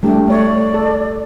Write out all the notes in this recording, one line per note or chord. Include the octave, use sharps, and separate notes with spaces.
G3 A3 D4 G4
A3 C#5 D5
A4